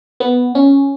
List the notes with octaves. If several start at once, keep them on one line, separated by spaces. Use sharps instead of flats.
B3
C#4